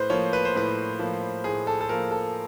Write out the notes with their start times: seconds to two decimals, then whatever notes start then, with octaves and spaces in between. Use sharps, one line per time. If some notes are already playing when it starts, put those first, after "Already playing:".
Already playing: A2 B4 C5
0.10 F3 A#3 C#5
0.33 B4
0.45 C5
0.55 A2 B4
0.99 F3 A#3
1.44 A2 G#4
1.67 A4
1.81 A4
1.89 F3 A#3 A#4
2.11 A4